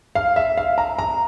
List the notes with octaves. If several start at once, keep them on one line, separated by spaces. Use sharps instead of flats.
F5
E5
F5
A#5
A#5